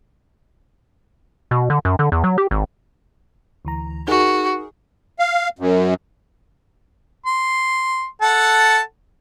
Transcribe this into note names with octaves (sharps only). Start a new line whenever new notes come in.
B2
D3
F#2
D3
E2
F#3
G4
G#1
D2 E3 A#5
D#4 F#4 G#4 A#4
F5
F#2
C6
A4 F#5 A5